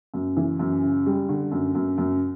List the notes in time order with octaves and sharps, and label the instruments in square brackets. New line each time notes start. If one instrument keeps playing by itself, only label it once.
[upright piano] F#2
E3
F#2
C#3
G3
D3
F#2
F#2
F#2